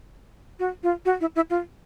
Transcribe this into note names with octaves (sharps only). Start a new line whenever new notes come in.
F#4
F4
F#4
E4
E4
F4